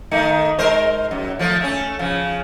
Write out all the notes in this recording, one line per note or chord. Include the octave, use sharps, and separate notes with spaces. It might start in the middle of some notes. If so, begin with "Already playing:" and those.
D#3 A3 D#4
G#3 A#4 C5
F#2
F3 A3
A3 C#4
C#3 F3